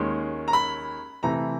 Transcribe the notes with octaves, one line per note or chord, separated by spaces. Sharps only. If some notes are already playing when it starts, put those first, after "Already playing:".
Already playing: D#2 D#3 G#3 C#4 C6
A#5
B5
C3 E3 A3 A#5